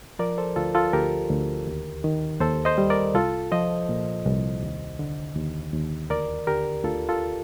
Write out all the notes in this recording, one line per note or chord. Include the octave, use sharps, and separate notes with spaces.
F3 A#4 D5
A4 C5
D2 F4 A4
F4 A4
D2 G4 A#4
D2
D#2
D#3
D#2 A4 C5
C5 D#5
G3
A#4 D5
C2 F4 A4
F3 C5 D#5
A#2
C2
D#2
D3
D#2
D#2
D2 A#4 D5
D3 G4 A#4
D2 F4 A4
F4 A4